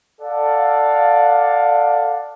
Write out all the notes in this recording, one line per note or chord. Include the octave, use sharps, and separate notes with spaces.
A4 D5 F5 F#5